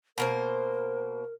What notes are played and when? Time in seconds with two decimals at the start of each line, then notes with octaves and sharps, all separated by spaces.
0.18 B2 A#3 A#4 C5